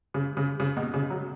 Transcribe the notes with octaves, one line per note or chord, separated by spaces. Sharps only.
C#3
C#3
C#3
B2
C#3
F#3